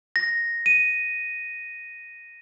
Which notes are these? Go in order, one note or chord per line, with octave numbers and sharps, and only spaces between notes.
A#6
D#7